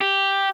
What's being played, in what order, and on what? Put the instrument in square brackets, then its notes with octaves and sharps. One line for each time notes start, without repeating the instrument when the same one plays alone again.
[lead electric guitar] G4